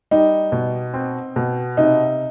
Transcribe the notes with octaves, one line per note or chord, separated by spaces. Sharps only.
G3 D#4
B2
C4
B2
C3 D#4